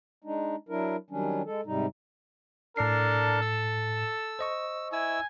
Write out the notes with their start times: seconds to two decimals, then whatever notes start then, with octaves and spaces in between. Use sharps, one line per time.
0.24 G#3 D4 D#4
0.69 F#3 D4 E4 A#4
1.10 D#3 F#3 G3 C#4 D4
1.46 G#3 A4
1.66 G#2 C3 G3 D#4
2.77 A2 D4 A4 A#4 C7
3.41 E6
4.39 C5 D#5 C#6
4.92 E4 G#5 E6